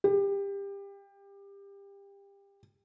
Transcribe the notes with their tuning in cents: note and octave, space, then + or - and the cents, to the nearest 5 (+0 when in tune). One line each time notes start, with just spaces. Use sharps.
G4 +25